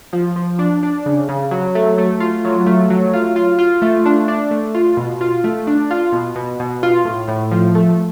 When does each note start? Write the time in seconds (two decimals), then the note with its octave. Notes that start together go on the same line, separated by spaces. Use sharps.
0.13 F3
0.36 F3
0.59 D4
0.83 D4
1.06 C#3
1.29 C#3
1.51 F#3
1.75 A3
1.98 A3
2.20 F4
2.44 F#3
2.66 A3
2.90 F#3
3.13 F4
3.36 F4
3.59 F4
3.82 A3
4.05 D4
4.28 D4
4.51 A3
4.74 F4
4.97 B2
5.21 F4
5.44 A3
5.67 D4
5.91 F4
6.12 B2
6.36 B2
6.60 B2
6.83 F4
7.05 A2
7.28 A2
7.52 F3
7.75 A3